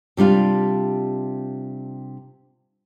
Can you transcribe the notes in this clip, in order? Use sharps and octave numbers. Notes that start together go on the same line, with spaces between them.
C3 G3 D4 F4